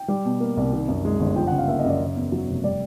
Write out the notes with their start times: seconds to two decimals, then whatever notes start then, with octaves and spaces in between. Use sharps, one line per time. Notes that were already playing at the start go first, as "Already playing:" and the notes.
Already playing: G5
0.08 G3
0.25 B2
0.40 A#3
0.57 C2
0.73 D#3
0.88 F#2
1.05 G#3
1.20 G1
1.36 F3 G5
1.47 F#5
1.52 C#3
1.58 F5
1.67 A#3 E5
1.79 D#5
1.84 F#2 D5
2.00 C#3
2.16 E2
2.32 F#3
2.47 F1
2.64 G3 D5